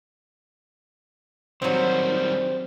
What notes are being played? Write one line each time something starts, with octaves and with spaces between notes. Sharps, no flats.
D#3 F#3 G3 C4 C5